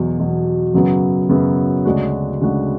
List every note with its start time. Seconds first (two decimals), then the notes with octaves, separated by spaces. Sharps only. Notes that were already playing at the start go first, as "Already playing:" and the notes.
Already playing: E2 B2 F#3
0.18 E2 B2 F#3
0.74 F#2 C#3 F#3 B3
1.29 F#2 C#3 F#3 B3
1.85 D2 C#3 G#3 D4 F#4
2.41 D2 C#3 G#3 D4 F#4